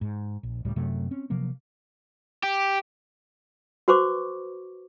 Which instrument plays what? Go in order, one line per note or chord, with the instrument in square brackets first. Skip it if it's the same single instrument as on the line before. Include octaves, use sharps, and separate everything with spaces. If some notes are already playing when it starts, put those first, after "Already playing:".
[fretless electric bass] G#2
A#1
C#2 A2 G3
F#2 C3 F#3 A3
C4 C#4
C3 F3 F#3 A#3
[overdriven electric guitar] G4
[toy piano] F#4 B4 C5 C#6 D6